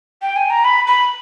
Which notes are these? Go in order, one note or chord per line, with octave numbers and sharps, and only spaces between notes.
G5
G#5
A#5
B5
B5